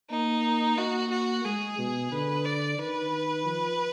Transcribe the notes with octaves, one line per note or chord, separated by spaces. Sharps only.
A#3 D#4
A#3 F#4
F#4
G#3 G#4
B2
D3 B4
D5
D#3 B4
F3